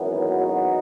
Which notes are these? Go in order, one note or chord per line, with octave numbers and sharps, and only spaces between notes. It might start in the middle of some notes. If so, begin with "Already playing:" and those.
Already playing: G#1 F#2 E3 B3
D#4 F#4